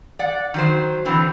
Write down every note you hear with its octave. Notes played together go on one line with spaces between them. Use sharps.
D5 F#5
D#3 F#3 C5
B2 D3 E3 C4